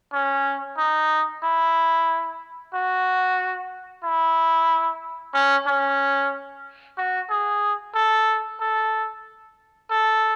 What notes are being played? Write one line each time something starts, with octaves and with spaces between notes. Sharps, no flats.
C#4
D#4
E4
F#4
E4
C#4
C#4
F#4
G#4
A4
A4
A4